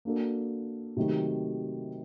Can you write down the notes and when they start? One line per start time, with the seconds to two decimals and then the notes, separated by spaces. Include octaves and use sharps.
0.05 A#3 D4 F#4 A4
0.97 C3 D#3 F#3 A3